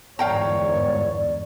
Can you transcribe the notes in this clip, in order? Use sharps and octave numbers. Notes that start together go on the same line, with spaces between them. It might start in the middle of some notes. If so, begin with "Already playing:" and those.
G1 E2 G#2 C#5 D5 F5 G5 A#5